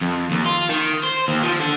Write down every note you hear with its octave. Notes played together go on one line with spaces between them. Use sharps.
F2
D#2
F4
D#3
C5
D#2
F3
D3